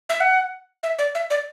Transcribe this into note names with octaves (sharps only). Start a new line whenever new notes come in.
E5
F#5
E5
D5
E5
D5